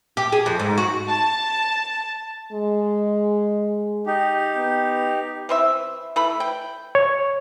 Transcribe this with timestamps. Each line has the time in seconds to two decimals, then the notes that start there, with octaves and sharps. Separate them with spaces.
0.17 G4
0.32 G#4
0.46 F2
0.60 G#2
0.78 F#4
1.08 A5
2.52 G#3
4.07 D#4 G4
4.56 B3
5.49 E3 C4 E5
6.16 E3 A3 B5
6.40 G5
6.95 C#5